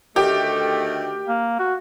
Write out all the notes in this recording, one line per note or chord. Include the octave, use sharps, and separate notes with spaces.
D2 D#3 A3 G4
A#3
F#4